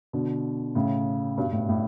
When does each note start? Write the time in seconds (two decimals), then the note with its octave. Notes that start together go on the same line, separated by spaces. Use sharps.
0.13 B2 D3
0.75 A2 C#3
1.37 G2 B2
1.53 A2
1.69 A2